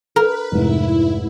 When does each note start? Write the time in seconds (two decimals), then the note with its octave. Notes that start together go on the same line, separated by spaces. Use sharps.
0.16 A#4 B4
0.52 F1 G#2 E4